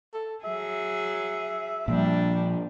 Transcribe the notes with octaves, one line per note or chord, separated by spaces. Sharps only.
A4
F#3 G#4 E5
A#2 F3 G3 D4